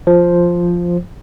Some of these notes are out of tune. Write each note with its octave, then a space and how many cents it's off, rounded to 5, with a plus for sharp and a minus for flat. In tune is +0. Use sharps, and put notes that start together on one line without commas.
F3 +0 C5 +0